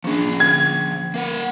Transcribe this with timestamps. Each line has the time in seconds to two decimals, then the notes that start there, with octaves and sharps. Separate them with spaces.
0.04 F3 A#3 C#4 D4 G#4
0.40 D3 G#6
1.14 A#3 A#4 F#5